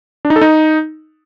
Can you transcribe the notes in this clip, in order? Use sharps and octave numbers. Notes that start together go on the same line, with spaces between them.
D4
D#4
A4
D#4